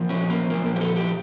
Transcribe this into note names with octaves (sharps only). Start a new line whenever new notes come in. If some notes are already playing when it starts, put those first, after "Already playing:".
Already playing: A#2 F3
C#4
A#3
A#2 F3 A#3
A#3
G4
A4
G4